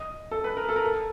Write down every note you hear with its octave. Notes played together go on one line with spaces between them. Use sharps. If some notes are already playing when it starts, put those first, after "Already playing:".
Already playing: D#5
A4
B4
A#4
A4
A#4
A4